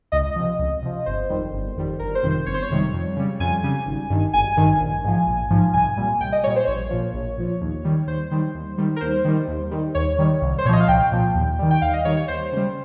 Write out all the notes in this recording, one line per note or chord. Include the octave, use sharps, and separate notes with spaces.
C#2 D#5
C3 F3
C#2
C3 F3
G1 C5
F2 D#3 G3
G1
F2 D#3 G3
G1 A#4
C5
F2 C3 D#3 G3
C5
G1 C#5
C5
C#5
F2 C3 D#3 G3
F2
C#3 G3
F2 G#5
C#3 G3
G#1
G2 D#3
G#1 G#5
G2 D#3
A#1
G#2 F3
A#1
G#2 F3
C2 G#5
A#2 G3
C2 G5
D#5
A#2 G3 C#5
C5
A#1 C#5
A#2 F3
A#1
A#2 F3
D#2
D#3 G3
D#2 C5
D#3 G3
D#2
D#3 G3
A#4
D#2 C5
D#3 G3
D#2
D#3 G3
D#2 C#5
D#3 G3
C2
C5
A#2 F3 C#5 D#5
F5
C2 G5
A#2 F3
D#2
D#3 G3
G5
D#2 F5
D#5
D#3 G3 C#5
C#5
D#2 C5
C#3 G3